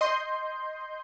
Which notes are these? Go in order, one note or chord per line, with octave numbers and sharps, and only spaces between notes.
D#5 C6 G6